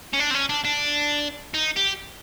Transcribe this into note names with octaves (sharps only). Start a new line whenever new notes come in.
C#4
D4
C4
C#4
D4
D4
D#4
G4